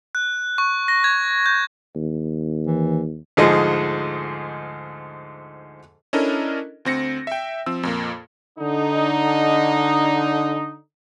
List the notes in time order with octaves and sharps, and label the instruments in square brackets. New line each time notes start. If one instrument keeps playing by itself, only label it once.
[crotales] F#6
C#6
A#6
G#6
G6
[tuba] D#2
[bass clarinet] E3
[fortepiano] D2 G#2 F3 G#4 D#5
[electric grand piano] C#4 D4 E4 A4 A#4 D#5
D2 C4 A#6 C#7
E5 G5
F3 C4 E6
F2 A#2 A#3
[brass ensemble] D3 D#4